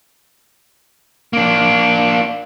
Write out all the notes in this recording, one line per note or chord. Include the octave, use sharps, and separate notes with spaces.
A#3 D4